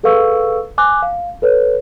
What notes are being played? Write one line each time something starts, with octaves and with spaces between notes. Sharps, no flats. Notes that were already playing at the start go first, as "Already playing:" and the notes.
G#4 A4 B4 F5 C#6 E6
G#5 D6 F#6
F5
A4 B4 C#5